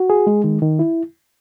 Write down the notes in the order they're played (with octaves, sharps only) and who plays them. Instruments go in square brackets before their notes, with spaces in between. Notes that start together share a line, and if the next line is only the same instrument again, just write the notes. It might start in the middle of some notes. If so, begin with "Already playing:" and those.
Already playing: [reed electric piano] F#4
G#4
G#3
D#3
D#3
E4